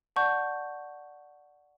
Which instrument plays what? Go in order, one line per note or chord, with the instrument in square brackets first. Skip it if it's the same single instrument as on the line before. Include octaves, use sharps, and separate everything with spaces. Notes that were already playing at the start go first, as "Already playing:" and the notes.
[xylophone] D5 F#5 A5 C#6 G6